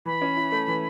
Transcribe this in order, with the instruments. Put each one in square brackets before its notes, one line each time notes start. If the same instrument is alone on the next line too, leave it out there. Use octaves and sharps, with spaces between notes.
[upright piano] E3 [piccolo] B5
[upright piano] C#4
E4
A3
E3